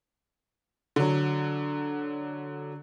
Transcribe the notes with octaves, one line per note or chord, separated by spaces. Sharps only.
D3 F#3